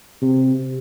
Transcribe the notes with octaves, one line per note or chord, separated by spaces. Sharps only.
C3